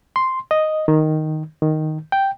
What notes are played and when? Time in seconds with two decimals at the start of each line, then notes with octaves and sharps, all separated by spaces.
0.16 C6
0.51 D#5
0.88 D#3
1.62 D#3
2.12 G5